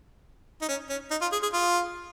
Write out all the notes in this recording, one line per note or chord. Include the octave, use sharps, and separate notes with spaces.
D#4
C#4
C#4
D#4
F4
G#4
G#4
F4